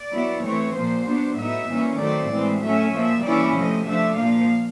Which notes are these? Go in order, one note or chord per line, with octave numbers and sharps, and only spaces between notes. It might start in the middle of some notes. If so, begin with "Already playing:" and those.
Already playing: D5
F#3 B3 E4
E3 A3 C4 C#5
A#2 F3 A#3 C5
F#3 B3 D4
A2 F#3 B3 D#4 E5
E3 G3 A#3 C#4
D#3 F#3 A3 C4 D5
A2 E3 G#3 C4
F#3 A3 C#4 E5
A#2 F3 A#3 E5
E3 G3 A#3 C#4 E4 D5
C3 F3 A3 D#5
F3 A3 D4 E5
A#2 F3 A#3 F5